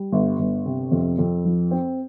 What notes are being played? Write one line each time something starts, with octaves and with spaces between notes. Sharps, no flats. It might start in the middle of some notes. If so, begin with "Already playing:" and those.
Already playing: G3
G1
G1
C3
F2
F2
F3
C4